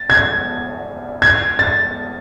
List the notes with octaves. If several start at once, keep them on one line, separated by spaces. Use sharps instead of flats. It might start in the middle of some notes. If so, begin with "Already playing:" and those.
Already playing: A6
G#6
G#6
A6